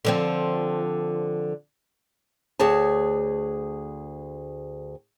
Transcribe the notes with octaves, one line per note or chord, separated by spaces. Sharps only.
D3 F3 C4
D2 G#4 C#5 A5